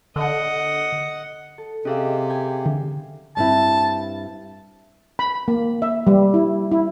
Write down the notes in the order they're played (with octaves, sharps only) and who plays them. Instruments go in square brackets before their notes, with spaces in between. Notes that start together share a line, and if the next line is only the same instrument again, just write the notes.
[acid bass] D3 [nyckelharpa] D#5 F#5
[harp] A4
[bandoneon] C3 [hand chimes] C#4 G#4 F5 [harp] D#5 G5 E6
[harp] B4 G5 G#5
[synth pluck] D3
[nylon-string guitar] G2 C4 E4 [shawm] A5
[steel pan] B5
A#3
E5
G3
E4
E4